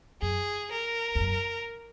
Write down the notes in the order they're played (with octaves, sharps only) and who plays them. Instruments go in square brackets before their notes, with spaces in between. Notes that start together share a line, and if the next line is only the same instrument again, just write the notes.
[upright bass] F#2 [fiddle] G#4
[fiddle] A#4
[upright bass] E2
F#2